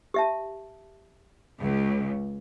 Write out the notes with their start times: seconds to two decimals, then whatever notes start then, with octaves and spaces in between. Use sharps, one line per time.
0.14 G4 E5 A5
1.60 C#2